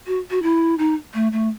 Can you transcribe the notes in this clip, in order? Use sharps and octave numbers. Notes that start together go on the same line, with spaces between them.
F#4
F#4
E4
D#4
A3
A3